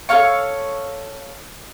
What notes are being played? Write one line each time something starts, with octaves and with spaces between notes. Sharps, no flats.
A4 C#5 F5 C#6